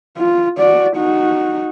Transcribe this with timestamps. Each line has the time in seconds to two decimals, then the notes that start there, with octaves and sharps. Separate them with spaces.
0.18 F4
0.58 F#4 D5
0.96 D#4 F#4